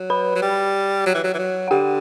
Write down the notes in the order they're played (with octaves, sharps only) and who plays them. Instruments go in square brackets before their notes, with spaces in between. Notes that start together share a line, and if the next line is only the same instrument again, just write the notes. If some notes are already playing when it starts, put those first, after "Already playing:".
Already playing: [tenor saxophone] F#3
[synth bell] B4 B5
[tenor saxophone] F#3
G3
F#3
E3
F#3
E3
F#3
[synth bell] F#5
[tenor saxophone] D3 [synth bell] G4 G5